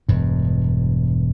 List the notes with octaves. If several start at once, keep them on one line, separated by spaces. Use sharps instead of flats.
E1 G2